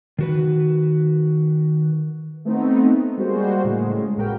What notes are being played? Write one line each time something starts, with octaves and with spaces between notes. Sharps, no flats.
D#3 F#4 B4
A3 B3 C4 D#4
G3 G#3 A#3 F#4 C5
A2 C#3 G#3
A1 A#3 F#4 A#4 B4 G5